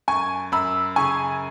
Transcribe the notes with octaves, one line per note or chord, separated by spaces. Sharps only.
F#2 G#5 C#6
F#2 B5 E6
C#3 G#5 C#6